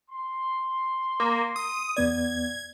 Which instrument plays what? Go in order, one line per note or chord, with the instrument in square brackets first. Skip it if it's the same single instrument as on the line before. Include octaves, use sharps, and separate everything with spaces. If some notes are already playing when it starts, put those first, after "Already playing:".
[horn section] C6
[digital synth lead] A#3
D#6
[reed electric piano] E2 B3 D5 [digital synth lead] G#6